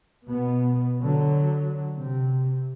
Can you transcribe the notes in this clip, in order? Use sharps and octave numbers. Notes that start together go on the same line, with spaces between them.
B2 B3
D3 F#3
C3